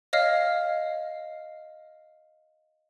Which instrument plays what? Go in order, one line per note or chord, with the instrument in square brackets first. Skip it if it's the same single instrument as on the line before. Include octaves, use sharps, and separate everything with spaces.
[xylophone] C#5 D#5 F5 F6 C7